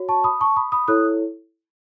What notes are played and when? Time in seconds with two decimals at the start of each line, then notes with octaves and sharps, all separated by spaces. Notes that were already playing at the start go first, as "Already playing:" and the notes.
Already playing: F#4 C#5
0.09 A5 C#6
0.24 B5 D#6
0.41 A5 C#6
0.56 B5 D#6
0.72 B5 D#6
0.88 E4 A4 C#5 D#6 F#6